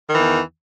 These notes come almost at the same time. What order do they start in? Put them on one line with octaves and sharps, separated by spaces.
D#3 E3 E2